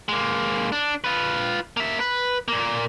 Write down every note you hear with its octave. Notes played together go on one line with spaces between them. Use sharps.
G#3 A#3
D4
F4 B4
A#3 E5
B4
A#2 A#3